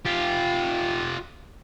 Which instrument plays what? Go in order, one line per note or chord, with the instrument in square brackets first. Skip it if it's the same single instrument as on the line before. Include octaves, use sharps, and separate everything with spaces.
[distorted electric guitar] F4 G4